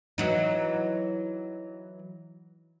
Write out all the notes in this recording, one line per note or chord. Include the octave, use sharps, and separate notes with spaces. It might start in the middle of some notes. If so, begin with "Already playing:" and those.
E3 F#3 D#4